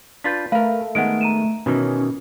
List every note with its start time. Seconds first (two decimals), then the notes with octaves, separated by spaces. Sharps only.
0.24 D4 F4 B4 G6 A6 B6
0.52 A3 A#4 B4 F5
0.95 D#3 G#3 B3 F#5 D7
1.21 A#5 D#7 E7
1.66 B2 D#3 E3 C#4